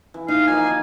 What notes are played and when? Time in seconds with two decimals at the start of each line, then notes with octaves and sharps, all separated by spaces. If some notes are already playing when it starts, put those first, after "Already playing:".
0.14 E3
0.28 D#4 F5
0.47 F3 A#3 D#5 G#5
0.67 D#3